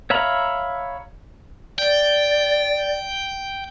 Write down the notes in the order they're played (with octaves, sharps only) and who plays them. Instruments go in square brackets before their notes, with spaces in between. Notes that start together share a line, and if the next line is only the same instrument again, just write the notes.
[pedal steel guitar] C#5 E5 F5 A#5 B5
[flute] D5 [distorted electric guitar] G5